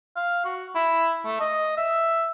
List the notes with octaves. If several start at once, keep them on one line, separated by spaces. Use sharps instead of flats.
F5
F#4
E4
A3
D#5
E5